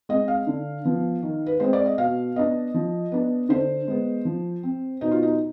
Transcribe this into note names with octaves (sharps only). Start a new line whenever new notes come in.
G#3 C4 D#5
F5
D3
F3 B3
D#3
B4
G#3 C4 C5
D5
D#5
B2 F5
B3 D4 D#5
F3
B3 D4
D3 C5
G#3 B3
F3
C4
B2 D#4
F4
D#4